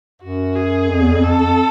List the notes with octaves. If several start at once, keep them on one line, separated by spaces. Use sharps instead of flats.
F#2 F#4
G#4
F2
E2
F2
F2 A4
F2